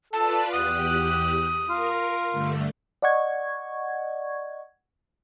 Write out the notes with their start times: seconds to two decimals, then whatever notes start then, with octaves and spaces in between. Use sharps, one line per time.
0.13 F4 A4 B4 D5 A5
0.53 E2 G4 F#5 D#6 F#6
1.69 F4 A#4
2.31 G2 D3 A3
3.02 D5 D#5 F#5 C#6 G#6